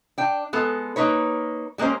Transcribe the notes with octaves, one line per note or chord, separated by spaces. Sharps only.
D4 G5
G#3 B3 A4
A#3 D#4 B4 C#5
G3 G#3 A#3 C#4 C5